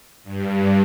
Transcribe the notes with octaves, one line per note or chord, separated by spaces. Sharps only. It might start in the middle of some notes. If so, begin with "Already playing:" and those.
G2